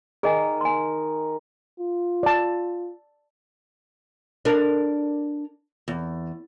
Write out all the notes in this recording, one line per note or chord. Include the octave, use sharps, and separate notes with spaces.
D#3 G#4 D#5 G#5
G#5 C6
F4
D5 A5
D4 A#4
E2